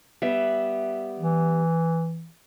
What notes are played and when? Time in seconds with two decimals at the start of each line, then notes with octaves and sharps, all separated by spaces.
0.22 G3 B3 E5
1.20 E3